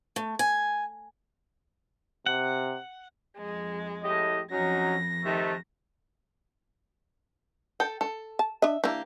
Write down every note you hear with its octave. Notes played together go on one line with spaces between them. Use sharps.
A3
G#5
C3 F#5
F2 G#3
A2 G4 D#5
F2 F#3 C#4 D#4 A#6
C3 D#3 A3
A4 G5
A4
A5
D4 D#5 E5
E3 A#3 D4 G4